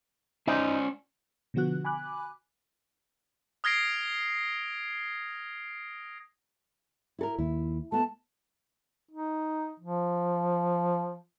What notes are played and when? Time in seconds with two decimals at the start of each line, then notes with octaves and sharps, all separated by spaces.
0.47 C#4 D#4 C5 D5
1.54 B2 D3 F3 B3 F#4 F#6
1.85 G#5 B5 D6 F#6
3.64 D#6 F6 G#6 A#6 C7 D7
7.19 E4 A4 A#4
7.38 D#2 E4
7.92 A3 B3 A5
9.11 D#4
9.80 F3